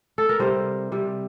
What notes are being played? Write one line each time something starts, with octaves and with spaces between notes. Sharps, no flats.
A4
A#4
C3 G3 C5
C3 G3